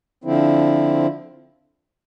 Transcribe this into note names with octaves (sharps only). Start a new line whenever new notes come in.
D3 F3 C4 E4